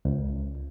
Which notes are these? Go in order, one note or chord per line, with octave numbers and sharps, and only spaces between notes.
C#2